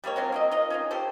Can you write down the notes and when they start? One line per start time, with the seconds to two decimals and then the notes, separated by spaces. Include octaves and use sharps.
0.04 G3 G#3 A#3 C#5
0.16 F#3 C4 F4
0.32 A#3 C4 D#5
0.52 F4 D#5
0.70 C#4 D#4 F4
0.91 C#4 G4 A4 C5